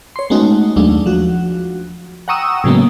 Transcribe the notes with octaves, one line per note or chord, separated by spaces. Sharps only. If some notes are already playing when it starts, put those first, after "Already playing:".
C#5 C6
G#3 A3 B3 C#4 D#4 F#4
D#2 F#3 G#3 A3 D4
F3 F#4
F#5 G5 A#5 C#6 D#6 E6
A2 C#3 F#3 G#3 A#3 B3